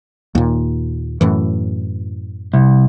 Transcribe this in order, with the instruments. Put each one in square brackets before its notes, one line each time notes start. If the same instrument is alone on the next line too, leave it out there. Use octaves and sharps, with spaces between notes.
[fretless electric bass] D#2 A#2
F#2 A2 E3
[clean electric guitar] C2